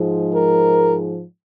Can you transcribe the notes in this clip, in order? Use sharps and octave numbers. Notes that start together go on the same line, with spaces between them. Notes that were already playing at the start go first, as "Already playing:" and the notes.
Already playing: G#2 F3 G#3
A#4